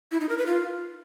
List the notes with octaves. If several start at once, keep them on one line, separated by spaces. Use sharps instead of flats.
E4
D#4
A#4
B4
F4